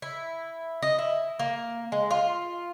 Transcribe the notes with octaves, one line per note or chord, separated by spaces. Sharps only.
E4
D#5
E4
A#3
G#3
F4